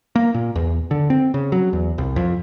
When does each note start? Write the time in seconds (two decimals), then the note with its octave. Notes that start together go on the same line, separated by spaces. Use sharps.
0.16 A#3
0.34 A#2
0.56 E2
0.91 D3
1.10 C4
1.34 C#3
1.52 F#3
1.73 E2
1.98 C2
2.16 F2